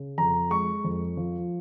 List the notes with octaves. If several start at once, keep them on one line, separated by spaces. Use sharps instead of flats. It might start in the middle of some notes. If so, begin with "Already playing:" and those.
Already playing: C#3
F2 A#5
G#3 C#6
F2
F3